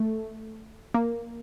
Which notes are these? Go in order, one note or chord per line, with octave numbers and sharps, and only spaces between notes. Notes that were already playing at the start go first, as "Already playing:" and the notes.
Already playing: A3
A#3